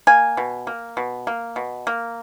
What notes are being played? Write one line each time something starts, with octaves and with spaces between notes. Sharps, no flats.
A#3 G#5
B2
A#3
B2
A#3
B2
A#3